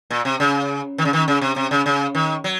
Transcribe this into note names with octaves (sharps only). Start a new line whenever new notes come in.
A#2
C3
C#3
D#3
C#3
D#3
C#3
C3
C3
C#3
C#3
D#3
F#3